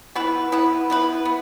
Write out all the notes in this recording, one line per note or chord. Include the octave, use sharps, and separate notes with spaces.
B3 E4 B4
B3 E4 B4
B3 E4 B4
B3